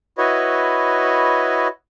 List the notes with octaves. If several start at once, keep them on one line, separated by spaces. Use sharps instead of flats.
E4 F#4 B4 C#5 D#5